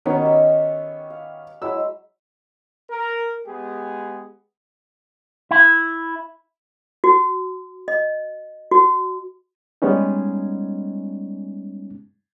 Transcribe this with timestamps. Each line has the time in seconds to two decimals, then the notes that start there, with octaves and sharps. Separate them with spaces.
0.06 D#3 F#3 B3 C#4 D#4 C#6
0.22 G4 E5
1.10 F5
1.62 F#3 G#3 E4 E6
2.90 A#4
3.47 G#3 B3 G4 G#4
5.51 E4
7.04 F#4
7.88 D#5
8.71 F#4
9.82 G3 G#3 B3 C#4 D#4